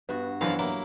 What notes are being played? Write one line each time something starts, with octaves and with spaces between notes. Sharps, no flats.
G2 B3 F#4
F#2 E3 F3 B3 D4 F4 F5
F#3 A#3 E4